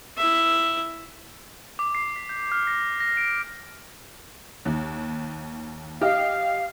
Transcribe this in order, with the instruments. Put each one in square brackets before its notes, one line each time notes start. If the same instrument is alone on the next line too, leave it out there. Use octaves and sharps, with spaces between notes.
[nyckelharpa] E4 E5
[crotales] D6
C7
B6
G6
F6
A#6
A#6
A#6
D7
[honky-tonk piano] D#2
[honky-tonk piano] G4 D#5 [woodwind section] F5